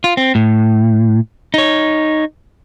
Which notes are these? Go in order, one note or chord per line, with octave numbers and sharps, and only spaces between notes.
F4
C4
A2
D#4 C#5